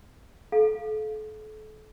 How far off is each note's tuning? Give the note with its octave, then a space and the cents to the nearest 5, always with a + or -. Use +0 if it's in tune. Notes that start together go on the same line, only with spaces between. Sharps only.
A4 -35 F5 +0